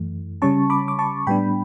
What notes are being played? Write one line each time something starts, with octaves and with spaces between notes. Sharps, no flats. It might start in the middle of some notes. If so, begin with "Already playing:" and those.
Already playing: F#2 E3 A3
C#3 G3 C#4 A5 C#6
B5 D6
D6
A5 C#6
A2 G3 B3 D4 G5 B5